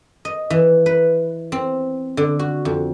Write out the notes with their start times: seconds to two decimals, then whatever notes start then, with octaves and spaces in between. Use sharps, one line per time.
0.25 D#5
0.50 E3
0.86 B4
1.52 C4
2.17 D3
2.39 F#4
2.65 F2